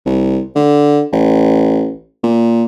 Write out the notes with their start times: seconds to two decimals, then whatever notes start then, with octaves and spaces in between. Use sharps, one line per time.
0.06 C2
0.56 D3
1.12 A1
2.23 A#2